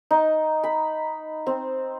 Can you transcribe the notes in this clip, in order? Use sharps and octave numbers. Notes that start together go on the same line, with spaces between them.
D#4
B5
C4